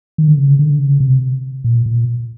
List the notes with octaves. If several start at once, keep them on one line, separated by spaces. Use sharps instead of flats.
D#3
D3
C#3
D3
C#3
C3
A#2
A#2